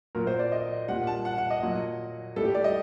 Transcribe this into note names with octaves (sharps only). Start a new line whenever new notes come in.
A#2 F#3 A#4
C5
D5
D#5
A#2 G3 F#5
A5
F#5
F#5
D#5
A#2 F#3
A2 G3 A4
G4
D5
D#5